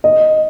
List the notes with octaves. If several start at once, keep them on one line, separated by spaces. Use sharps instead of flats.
D#5